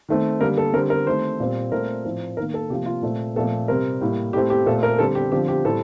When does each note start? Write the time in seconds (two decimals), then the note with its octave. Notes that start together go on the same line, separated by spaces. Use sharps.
0.09 D#3 A3 C4
0.41 D3 G3 A#3 A#4
0.58 A4
0.73 D3 G3 C4 A#4
0.90 A#4
1.06 D#3 A3 C4 C5
1.40 A#2 G3 C4
1.72 A#2 A3 C4 A#4
2.04 A2 F3 C4
2.37 D#3 A#3 A#4
2.54 A4
2.70 C3 F3 A#3 G4
2.86 F4
3.02 A#2 A3 C4
3.35 A#2 F3 A3 C4 A4
3.68 C3 G3 C4 A#4
4.01 A2 G3 A#3
4.33 A2 A3 C4 G4
4.50 G4
4.66 A#2 A3 C4 A4
4.83 A#4
4.99 D3 G3 C4 A4
5.15 G4
5.32 D3 F3 C4 G4
5.48 G4
5.65 A2 G3 C4 A4